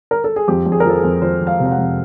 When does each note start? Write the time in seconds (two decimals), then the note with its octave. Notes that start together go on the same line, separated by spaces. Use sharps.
0.11 A#4
0.24 A4
0.36 G#4
0.48 F2 G4
0.66 F2
0.72 G#4
0.80 A#4
0.85 F3 A4
0.98 G#4
1.04 F2
1.22 F3 C5
1.41 F3
1.47 F5
1.60 C3
1.66 F5
1.71 F#5
1.78 F2